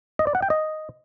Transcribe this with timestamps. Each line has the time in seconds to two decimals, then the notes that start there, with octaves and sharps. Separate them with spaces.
0.19 D#5
0.27 D5
0.35 F#5
0.42 G5
0.50 D#5